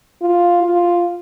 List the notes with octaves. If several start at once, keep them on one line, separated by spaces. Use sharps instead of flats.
F4
F4